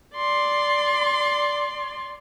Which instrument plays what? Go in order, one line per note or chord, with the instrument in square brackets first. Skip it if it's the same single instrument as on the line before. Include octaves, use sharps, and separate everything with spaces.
[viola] D5 C6